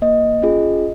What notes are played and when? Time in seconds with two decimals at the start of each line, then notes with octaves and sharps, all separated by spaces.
0.02 A#3 D#5
0.42 C#4 F4 G#4